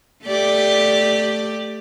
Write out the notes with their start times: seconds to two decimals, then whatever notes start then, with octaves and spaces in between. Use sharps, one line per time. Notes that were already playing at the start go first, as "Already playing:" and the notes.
0.25 A3 G4 D5